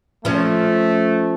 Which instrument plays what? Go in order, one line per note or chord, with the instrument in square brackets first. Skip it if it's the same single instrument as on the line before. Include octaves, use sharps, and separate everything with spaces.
[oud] F3 C#4 [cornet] A3